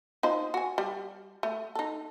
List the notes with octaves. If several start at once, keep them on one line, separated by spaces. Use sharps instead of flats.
D#4 F4 C5
F#4 G#5
G3
A3
D#4 A4